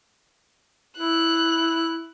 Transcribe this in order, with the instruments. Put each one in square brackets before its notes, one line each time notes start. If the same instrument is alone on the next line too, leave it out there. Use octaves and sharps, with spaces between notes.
[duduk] E4 [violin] F#6